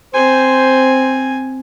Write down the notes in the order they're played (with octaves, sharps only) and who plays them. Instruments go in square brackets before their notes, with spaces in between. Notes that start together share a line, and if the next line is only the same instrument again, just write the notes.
[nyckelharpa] C4 G#5 [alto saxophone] C5